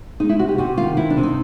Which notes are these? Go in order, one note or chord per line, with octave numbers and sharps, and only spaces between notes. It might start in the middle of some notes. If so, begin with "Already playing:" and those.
G#3 D#4
E4
C3 F#4
G4
C3 F#4
D#3 F4
C3 E4
D4
C3
D#4